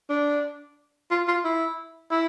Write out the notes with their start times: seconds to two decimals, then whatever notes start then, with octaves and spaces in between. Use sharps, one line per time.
0.10 D4
1.11 F4
1.27 F4
1.44 E4
2.11 E4